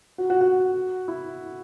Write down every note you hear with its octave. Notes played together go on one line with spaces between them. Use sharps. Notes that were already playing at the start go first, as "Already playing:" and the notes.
F#4
F#4
F#4
E4